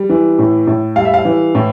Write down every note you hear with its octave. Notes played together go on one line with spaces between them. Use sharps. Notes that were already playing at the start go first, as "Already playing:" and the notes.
Already playing: G3
E3
A2
A2
G3 F5
E5
F5
E3
A2